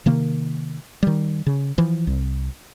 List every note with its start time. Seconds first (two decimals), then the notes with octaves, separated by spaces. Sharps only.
0.06 C3 D#3 A#3
1.03 D#3 G3
1.47 C#3
1.78 E3 F3
2.07 C2